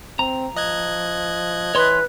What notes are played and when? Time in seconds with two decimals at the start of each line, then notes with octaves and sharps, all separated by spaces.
0.19 C4 A#5
0.56 F3 D#5 F#6 G#6
1.75 E3 B4 C#5 C6